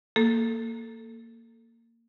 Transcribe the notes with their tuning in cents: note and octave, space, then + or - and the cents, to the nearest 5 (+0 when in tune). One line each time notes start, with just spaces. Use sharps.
A#3 -15 A4 +0